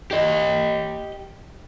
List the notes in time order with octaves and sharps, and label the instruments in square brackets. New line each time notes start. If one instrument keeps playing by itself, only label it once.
[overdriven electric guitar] G4 D#5